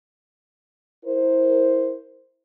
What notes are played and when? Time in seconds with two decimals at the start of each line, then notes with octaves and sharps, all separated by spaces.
1.04 E4 A#4 C5